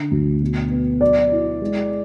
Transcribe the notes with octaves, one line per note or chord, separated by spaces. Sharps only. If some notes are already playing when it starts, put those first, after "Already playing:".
Already playing: D3
D2
B2
B3
F#3 D5
E4
G#3